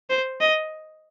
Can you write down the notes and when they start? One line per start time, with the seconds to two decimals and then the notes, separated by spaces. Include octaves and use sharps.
0.10 C5
0.41 D#5